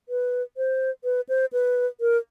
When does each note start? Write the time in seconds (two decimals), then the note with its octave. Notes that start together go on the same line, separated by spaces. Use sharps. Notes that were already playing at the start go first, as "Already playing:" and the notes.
0.09 B4
0.57 C5
1.04 B4
1.29 C5
1.53 B4
2.01 A#4